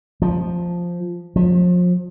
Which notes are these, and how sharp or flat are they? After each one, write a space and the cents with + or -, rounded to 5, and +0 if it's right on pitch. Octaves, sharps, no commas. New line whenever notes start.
F3 +0
F3 +35